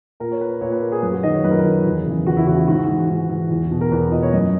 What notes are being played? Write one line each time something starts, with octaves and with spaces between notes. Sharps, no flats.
A#2 A#4
C#5
B4
A#2 C#5
B4
A#4
G#4
F#2 B4
F#4
D#3 D#5
C#5
F#2 B4
A#4
B4
D#3
E2 G#4
C#3 E3
E2 F#4
E4
C#3 E3 F#4
F#4
G#2 F#4
E3
G#2
E3
E2
B2
A#4
E2 B4
B2 D#5
C#5
F#2 D#5